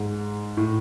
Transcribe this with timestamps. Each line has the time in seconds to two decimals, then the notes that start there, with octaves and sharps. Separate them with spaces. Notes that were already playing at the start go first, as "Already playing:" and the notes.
Already playing: G#2
0.57 A2